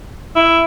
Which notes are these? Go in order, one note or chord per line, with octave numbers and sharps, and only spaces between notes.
E4